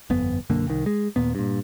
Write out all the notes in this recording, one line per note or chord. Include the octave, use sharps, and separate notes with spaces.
G1 F2 B3
B1 F#2 D3 A#3
C2 D#3
G#3
D#2 A#2 B3
G2 A#2